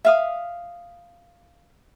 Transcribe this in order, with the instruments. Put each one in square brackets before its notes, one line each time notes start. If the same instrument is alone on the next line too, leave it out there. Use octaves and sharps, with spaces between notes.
[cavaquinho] E5 F5 D#6